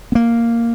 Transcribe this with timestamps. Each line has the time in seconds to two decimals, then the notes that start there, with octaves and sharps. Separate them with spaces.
0.12 B3
0.15 A#3